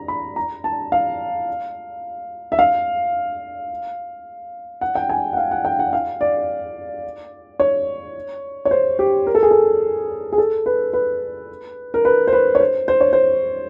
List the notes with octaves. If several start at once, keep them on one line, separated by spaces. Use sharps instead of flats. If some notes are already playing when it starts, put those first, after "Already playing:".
Already playing: A#5
B5
A#5
A5
F5
E5
F5
F#5
G5
G#5
F#5
F5
F#5
G5
F#5
F5
D5
C#5
C#5
C5
G4
A#4
A4
G#4
A4
G#4
A4
B4
B4
A#4
B4
C5
B4
C#5
C5
C5
C#5
C5